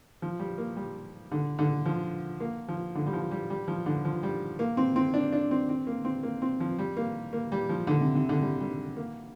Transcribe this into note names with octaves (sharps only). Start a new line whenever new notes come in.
F3
G3
A#3
G3
D3
D3
F3
A#3
F3
D3
G3
F3
G3
G3
F3
D3
F3
G3
A#3
C4
C4
D4
D4
C4
C4
A#3
C4
A#3
C4
F3
G3
A#3
A#3
G3
F3
D3
C3
C3
D3
G3
G3
A#3